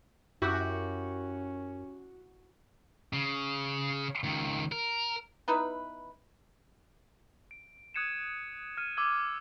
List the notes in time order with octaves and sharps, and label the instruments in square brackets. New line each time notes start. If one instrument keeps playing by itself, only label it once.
[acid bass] F#2 [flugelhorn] C#4 [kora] E4 G4 [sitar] F#4
[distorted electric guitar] C#3
C#2 D#3
A#4
[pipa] B3 D#4 E4 B4
[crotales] D7
D#6 F#6 G#6 C#7 D#7 E7
F6 G#6 D#7
D6 E6 G#6